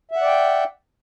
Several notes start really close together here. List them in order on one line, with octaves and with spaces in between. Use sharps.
E5 F#5 D5 G5